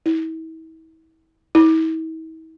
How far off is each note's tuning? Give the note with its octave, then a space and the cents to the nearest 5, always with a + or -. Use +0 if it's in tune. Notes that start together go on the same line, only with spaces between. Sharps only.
E4 -40
E4 -45